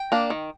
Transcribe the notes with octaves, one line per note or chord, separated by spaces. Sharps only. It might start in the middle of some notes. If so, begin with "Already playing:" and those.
Already playing: G5
A#3 D4
D#3